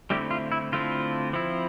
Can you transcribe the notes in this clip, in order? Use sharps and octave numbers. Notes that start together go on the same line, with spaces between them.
D3 G3 A3 C4 E4 G4
F4
E4
D3 A3 C4 E4 F4
F3 C4 E4